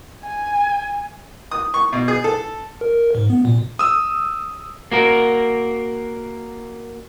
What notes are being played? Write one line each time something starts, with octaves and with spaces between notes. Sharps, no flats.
G#5
D#6
C#6
B2
G#4
A4
A#4
G#2
B3
A#2
D#6 E6
A#3 F#4 A#4